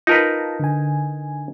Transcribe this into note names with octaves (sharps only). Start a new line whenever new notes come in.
D#4 F4 A#4 B4 A5 A#5
D3 G#5